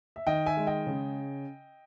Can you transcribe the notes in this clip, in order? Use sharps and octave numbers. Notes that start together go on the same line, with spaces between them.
E5
D#3 D#5 G5
E5 G#5
G#3
D#5 G5
C#3